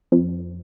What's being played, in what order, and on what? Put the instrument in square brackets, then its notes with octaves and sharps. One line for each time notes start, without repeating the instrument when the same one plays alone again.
[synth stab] F2